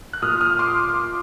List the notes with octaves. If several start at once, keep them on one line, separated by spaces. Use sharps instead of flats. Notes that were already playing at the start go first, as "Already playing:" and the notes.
F#6
A#2 D#6 F6
D#6 F6
C6 D6